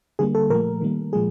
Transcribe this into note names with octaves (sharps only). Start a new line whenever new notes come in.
D3 G3 A#3 G#4
A4
A#2 F3 A3 A#4
D#3 G3 A#3
A#2 F3 G#3 G#4